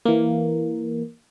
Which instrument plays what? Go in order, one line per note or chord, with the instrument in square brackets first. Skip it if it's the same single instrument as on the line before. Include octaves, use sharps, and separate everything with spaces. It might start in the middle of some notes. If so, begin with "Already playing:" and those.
[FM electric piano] E3 A#3